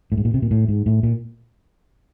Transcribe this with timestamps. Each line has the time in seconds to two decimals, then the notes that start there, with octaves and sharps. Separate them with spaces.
0.12 A2
0.18 G#2
0.25 A#2
0.34 C3
0.42 A#2
0.51 A2
0.68 G#2
0.86 A2
1.03 A#2